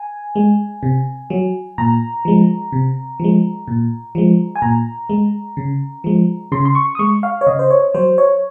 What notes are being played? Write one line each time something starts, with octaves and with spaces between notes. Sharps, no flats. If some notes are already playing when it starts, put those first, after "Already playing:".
Already playing: G#5
G#3
C3
F#3
A#2 A#5
F3 G#3
C3
F3 G#3
A#2
F3 G#3
G#5
A#2 A#5
G#3
C#3
F3 G#3
C#3 C6
C6
C#6
D#6
G#3 C#6
F5
C#5
C#3 D#5
C5
C#5
F#3 C5
C#5